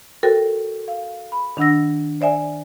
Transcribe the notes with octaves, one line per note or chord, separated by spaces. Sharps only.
F#4 A4 A#4 C5 G5
F5
B5
D#3 D4 F#5 E6 A#6
C5 D5 E5 G#5